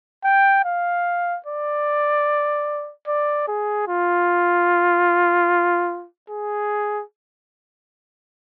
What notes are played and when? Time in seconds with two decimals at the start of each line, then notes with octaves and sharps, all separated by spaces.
0.24 G5
0.65 F5
1.46 D5
3.07 D5
3.48 G#4
3.88 F4
6.30 G#4